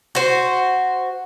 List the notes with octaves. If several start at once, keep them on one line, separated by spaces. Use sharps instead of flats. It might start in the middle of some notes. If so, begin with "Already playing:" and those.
F#4 C5